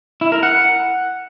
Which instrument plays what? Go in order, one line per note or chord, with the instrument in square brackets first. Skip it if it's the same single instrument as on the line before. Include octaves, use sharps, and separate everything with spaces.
[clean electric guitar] E4
A#4
F#5